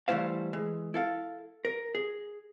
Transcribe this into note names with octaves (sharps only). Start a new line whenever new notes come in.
E3 G3 A3 E4 C5 F5
E3 G#3
E4 A4 F5
A#4
G#4